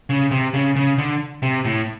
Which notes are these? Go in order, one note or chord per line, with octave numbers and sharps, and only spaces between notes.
C#3
C3
C#3
C#3
D3
C3
A2